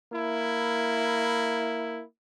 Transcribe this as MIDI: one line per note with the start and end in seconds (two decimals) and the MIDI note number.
0.12 2.03 58
0.12 2.03 64